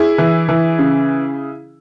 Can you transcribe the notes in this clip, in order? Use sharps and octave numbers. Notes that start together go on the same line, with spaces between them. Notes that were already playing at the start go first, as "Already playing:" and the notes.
Already playing: E4 G#4
E3
E3
C#3